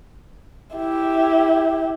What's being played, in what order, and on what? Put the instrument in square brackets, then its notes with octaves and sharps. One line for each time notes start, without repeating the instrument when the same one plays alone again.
[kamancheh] E4 G4